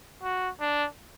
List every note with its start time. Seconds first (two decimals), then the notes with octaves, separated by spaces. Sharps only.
0.23 F#4
0.60 D4